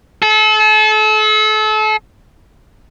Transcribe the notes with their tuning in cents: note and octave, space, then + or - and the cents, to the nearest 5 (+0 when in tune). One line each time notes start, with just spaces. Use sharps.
A4 -35